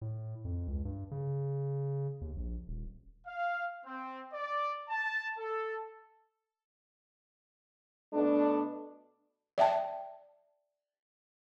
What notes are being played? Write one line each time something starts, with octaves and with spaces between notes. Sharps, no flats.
A2
F2
C#2
G2
C#3
D#2
A#1
D#1
F5
C4
D5
A5
A4
B2 A3 D4
D5 E5 G5 A5